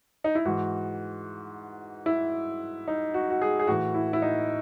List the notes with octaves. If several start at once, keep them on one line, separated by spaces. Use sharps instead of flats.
D#4
E4
G#2 E3 F#4
E4
D#4
F#4
F#4
G#4
G#4
A2 E3 F#4
E4
E4
D#4